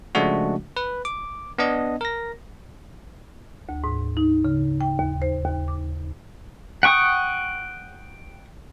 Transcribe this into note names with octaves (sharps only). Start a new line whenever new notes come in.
C#3 F3 G#3 A3 D4 F#4
B4
D6
B3 D4 D#5
A#4 A#6
D2
G#2
D#4
C#3
G5
D#2
C5
D#2
D6
F#5 G5 C#6 D#6